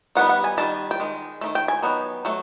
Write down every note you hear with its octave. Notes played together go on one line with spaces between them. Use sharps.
D#3 G3 B3 D#4 F#5
F#5
G#5
D#3 G3 A5
G5
D#3 G#3
D#3 F#3 A3
G5
G#5
F#3 B3 D#4
F#3 A3